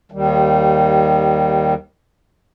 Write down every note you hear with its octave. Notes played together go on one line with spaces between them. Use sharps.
D#2 D#3 G3